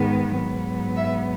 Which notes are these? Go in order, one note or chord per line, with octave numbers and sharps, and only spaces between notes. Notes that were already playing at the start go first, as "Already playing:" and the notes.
Already playing: G#2 D#3 G#3 B3
G#2 F#3 B3
E5